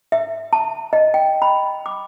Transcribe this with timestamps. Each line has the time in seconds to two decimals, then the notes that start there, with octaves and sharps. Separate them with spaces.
0.12 E5
0.53 A5
0.93 D#5
1.14 G5
1.42 B5
1.86 D6